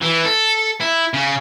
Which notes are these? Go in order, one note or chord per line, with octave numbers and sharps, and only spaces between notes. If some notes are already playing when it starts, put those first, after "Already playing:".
E3
A4
E4
C#3